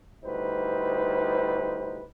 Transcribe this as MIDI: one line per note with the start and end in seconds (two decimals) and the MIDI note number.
0.24 2.04 38
0.24 2.04 55
0.24 2.04 63
0.24 2.04 64
0.24 2.04 71
0.24 2.04 72